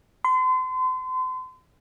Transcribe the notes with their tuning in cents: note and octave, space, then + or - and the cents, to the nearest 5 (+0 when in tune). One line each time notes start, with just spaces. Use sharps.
C6 -35